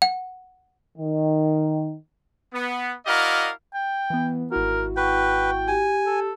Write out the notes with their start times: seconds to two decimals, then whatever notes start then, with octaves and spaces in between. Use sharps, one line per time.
0.02 F#5
0.98 D#3
2.54 B3
3.06 E4 F#4 A#4 D5 D#5 F5
3.73 G5
4.10 E3 B3
4.52 G#1 E4 F#4 A#4
4.97 B4 F#5 G5 C#6
5.68 G4 G#5
6.06 A4